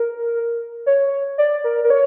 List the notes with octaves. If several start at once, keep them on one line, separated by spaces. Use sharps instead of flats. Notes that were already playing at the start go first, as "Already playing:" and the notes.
Already playing: A#4
C#5
D5
A#4
A#4
C#5